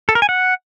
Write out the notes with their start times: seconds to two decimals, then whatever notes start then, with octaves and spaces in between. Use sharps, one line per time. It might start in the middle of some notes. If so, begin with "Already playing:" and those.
0.09 A4
0.15 A#4
0.22 G#5
0.29 F#5